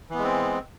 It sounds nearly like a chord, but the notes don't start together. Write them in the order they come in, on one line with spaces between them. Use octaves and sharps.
E3 B3 G#3 C4